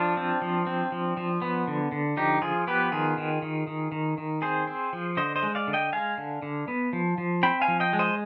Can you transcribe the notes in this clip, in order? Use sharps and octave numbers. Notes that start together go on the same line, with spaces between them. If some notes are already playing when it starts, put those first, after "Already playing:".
Already playing: F3 D4 F4
C4
F3
C4
F3
F3
B3
D3
D3
F3 D#4 G4
F3 F4 G#4
B3 G4 B4
D#3 F4 G#4
D#3
D#3
D#3
D#3
D#3
C4 G#4 C5
C4
F3
D3 C5 D#5
C5 D#5
G#3
D5 F5
D3
D#5 G5
G#3 F5 G#5
D3
D3
B3
F3
F3
C4 G5 B5
F5 G#5
F3
D#5 G5
G#3
C5 D#5